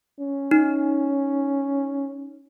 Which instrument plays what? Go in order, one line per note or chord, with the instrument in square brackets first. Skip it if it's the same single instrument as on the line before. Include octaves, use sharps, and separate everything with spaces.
[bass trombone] C#4
[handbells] D#4